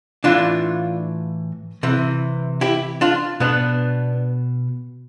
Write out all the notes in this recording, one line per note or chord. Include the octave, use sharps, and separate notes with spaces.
A2 E3 D4 F4
C3 E3
E4 G4
D4 F4
B2 B3 D4